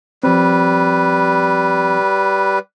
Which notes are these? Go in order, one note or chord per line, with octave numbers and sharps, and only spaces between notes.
F3 G3 C4 B4